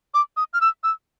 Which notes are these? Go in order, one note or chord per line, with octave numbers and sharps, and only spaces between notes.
D6
D#6
F6
E6
E6